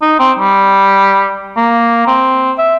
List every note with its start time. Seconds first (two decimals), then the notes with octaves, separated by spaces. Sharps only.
0.02 D#4
0.19 C4
0.39 G3
1.57 A#3
2.07 C4
2.58 E5